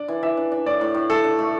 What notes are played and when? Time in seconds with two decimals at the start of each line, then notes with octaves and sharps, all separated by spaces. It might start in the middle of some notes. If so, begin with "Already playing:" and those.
Already playing: D4 D5
0.08 E3
0.23 E3 E5
0.37 D4
0.52 D4
0.66 A2 D5
0.81 A2
0.94 A2
1.10 A3 A4
1.24 D4
1.39 A3